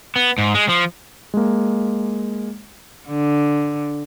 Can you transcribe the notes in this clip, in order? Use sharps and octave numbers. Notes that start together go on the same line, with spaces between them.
B3
G#2
G#3
F3
G#3 A#3
D3